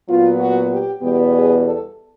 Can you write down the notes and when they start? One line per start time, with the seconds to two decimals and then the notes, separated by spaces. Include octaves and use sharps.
0.09 A#2 F#3 B3 F4
0.39 F#4
0.70 G4
1.01 E2 B2 G3 B3 G4
1.32 G#4
1.62 A4